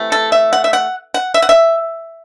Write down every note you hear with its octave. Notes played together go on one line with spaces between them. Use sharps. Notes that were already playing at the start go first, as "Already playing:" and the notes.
Already playing: C3 E3 A3
A4
E5
F#5
E5
F#5
F#5
E5
F#5
E5